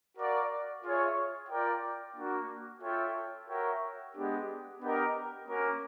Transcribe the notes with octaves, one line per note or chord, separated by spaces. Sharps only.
F#4 A#4 D5 F5
F4 G#4 C#5 E5
F4 A#4 D5 G5
A#3 D4 F#4
F4 A4 C#5 E5 G5
F#4 A#4 C#5 E5 G5
G#3 B3 D4 G4
B3 D4 G4 A#4 D#5
A#3 C#4 F#4 A#4